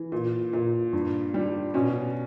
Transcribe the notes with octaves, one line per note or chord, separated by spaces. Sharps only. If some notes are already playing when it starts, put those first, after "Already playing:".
Already playing: E3
A#2
A#2
G2
G3
B2 C#4